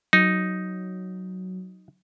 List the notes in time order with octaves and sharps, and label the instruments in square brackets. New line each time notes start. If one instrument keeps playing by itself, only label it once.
[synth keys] F#3 [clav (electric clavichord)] D#4